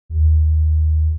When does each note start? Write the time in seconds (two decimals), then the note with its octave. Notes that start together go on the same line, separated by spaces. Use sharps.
0.09 D#2